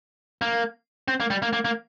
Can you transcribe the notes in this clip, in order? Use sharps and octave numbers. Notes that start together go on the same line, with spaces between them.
A#3
C4
A#3
G3
A#3
A#3
A#3